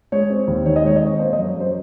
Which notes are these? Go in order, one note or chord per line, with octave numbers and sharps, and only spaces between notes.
G#3 C#5
C4
D#2
D#3 C#5
D#5
G#3 C#5
D#5
C4 C#5
A#3 C5
D#5
F#2
C#5
F#2 C5